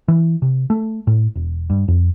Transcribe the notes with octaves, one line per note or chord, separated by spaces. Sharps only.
E3
C3
A3
A2
E1
G2
F2